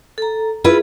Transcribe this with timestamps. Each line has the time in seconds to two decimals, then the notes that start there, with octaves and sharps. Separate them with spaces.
0.18 A4 A#5
0.64 E4 F4 G#4 B4